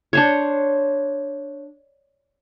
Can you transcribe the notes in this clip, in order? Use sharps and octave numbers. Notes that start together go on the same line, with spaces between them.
D4 C5 C#5